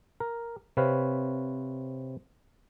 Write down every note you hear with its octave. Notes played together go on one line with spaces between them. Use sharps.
A#4
C3 C4 B4 C#5 F5